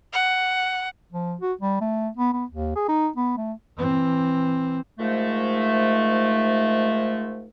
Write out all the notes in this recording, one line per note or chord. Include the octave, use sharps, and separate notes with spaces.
F#5
F3
F#4
G3
A3
B3
B3
D#2
G#4
D#4
B3
A3
E3 C4
G#2 D#3 F3 G#3 A3